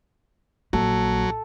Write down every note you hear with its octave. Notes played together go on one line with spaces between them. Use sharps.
A#1 F#3 A#3 A4